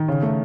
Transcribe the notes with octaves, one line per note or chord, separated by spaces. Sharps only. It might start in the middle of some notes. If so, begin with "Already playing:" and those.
Already playing: D#3
C#3
A3